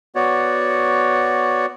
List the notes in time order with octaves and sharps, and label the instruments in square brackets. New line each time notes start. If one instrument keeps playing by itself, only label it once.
[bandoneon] B3 F#4 C#5 D5